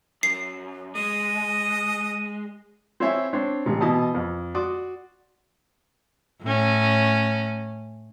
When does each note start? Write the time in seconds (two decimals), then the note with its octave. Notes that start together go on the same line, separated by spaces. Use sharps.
0.23 F#2 C7
0.95 G#3 D#5 D#7
3.00 C4 E4 C5 C#5 E5 G#5
3.33 C4 D4 C#5
3.66 A1 C3
3.81 B2 E3 D#5 A5 D#6
4.14 F2
4.55 F#4 D5 C6 D6 D#6
6.43 A2 C#4